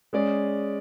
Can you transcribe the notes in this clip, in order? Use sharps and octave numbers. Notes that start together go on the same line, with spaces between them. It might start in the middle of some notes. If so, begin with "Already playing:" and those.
G#3 C#4 G#4 D5